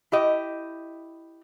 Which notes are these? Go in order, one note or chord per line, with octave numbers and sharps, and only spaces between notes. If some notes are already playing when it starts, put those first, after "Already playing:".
E4 G4 D#5